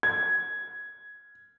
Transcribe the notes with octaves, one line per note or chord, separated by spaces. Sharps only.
G#6